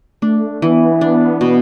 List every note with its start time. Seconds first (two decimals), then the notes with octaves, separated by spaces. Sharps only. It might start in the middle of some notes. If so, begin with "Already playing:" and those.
0.22 A3 D4
0.61 E3 B3
1.01 D4
1.41 B2